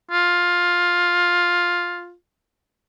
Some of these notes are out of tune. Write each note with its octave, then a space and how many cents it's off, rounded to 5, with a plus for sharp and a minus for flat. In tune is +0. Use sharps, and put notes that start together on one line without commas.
F4 +10